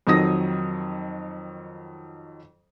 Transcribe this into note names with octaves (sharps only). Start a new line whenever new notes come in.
F2 D#3 F#3 D#6 A#6